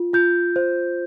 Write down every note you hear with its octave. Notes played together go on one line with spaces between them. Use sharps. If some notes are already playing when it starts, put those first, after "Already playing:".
Already playing: F4
F4 G6
C5